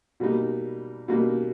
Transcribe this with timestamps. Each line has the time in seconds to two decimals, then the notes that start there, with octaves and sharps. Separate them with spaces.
0.20 B2 G3 A#3 D#4
1.08 B2 G3 A#3 D#4